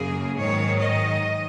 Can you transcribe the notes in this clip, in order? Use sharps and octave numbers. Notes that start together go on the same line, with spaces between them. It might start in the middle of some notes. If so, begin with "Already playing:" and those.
Already playing: F#2 C#3 A#3 G#4
G#2 D#3 F#3 C#5
D#5